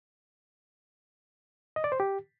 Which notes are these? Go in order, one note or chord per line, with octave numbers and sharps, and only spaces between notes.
D#5
D5
C5
G4